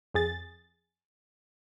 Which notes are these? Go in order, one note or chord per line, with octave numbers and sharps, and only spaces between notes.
F2 G#4 A6